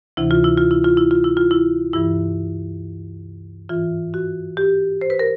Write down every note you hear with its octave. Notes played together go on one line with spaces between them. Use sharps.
D2 C3 E3 E4
F4
E4
F4
E4
F4
E4
F4
E4
F4
E4
G2 E3 E4
G#2 E3 F4
F#4
G4
C5
B4
A#4